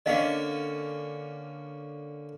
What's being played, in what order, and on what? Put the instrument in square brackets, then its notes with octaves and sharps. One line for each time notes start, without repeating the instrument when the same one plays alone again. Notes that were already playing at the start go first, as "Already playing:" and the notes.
[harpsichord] D3 A#3 C#4 [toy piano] D#5 F5 F#5